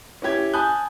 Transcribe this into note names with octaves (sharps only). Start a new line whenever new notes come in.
C#4 E4 G4 G#6
G#5 A5 B5 D#6 F#6 G6